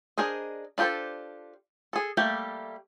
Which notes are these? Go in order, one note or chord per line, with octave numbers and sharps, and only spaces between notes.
D4 G#4 A#4 C5 D#5
D4 F4 G4 A4 C5
G#4 A4
G3 A3 A#3 G4